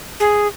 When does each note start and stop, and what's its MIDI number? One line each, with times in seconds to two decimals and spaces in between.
0.20 0.47 68